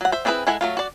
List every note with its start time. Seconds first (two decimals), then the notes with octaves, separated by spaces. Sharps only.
0.01 F#3 F#5
0.12 C5 E5
0.25 C4 D4 E4 G#4 B4
0.47 G#3 E4 A4 F#5 G#5
0.61 F#3 A3 F4
0.77 F#4 D5